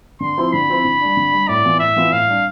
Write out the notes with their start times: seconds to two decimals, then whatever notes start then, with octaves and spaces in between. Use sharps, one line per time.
0.20 D3 C6
0.37 F3 C4 E4
0.53 D3 B5
0.69 F3 C4 E4
0.84 D3
1.01 G3 D4
1.17 D3
1.32 G3 D4
1.48 A2 D5
1.65 E3 B3 F4
1.80 A2 E5
1.96 E3 B3 F4
2.12 A2 F5
2.27 G3 D4